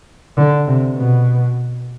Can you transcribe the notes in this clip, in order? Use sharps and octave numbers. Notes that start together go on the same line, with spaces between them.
D3
C3
B2